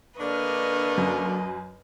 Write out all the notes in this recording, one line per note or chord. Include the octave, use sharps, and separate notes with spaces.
D3 A#3 D4 B4 D#5 C#6 F6
F#2